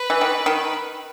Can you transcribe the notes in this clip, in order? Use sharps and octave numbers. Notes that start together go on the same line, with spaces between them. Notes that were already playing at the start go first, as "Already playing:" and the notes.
Already playing: B4
E3
D#3
D#3